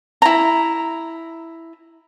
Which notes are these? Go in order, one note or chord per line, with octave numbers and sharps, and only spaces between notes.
E4 A#5